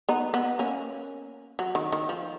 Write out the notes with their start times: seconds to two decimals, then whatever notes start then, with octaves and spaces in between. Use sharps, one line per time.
0.09 B3 D#4
0.34 B3
0.59 A#3 C#4
1.59 F#3
1.75 D#3
1.92 D#3
2.09 F3